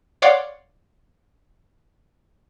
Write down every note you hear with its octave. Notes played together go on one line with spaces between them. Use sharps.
C#5 D5 F5 F#5 C6 D6